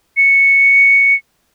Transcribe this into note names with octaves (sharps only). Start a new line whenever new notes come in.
C#7